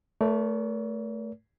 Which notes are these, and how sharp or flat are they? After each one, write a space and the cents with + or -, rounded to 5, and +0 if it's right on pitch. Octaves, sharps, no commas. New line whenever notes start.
A3 +0 A#4 +40 D5 -45